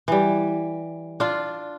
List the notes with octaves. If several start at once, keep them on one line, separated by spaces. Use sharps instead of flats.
E3 G3
D4 F4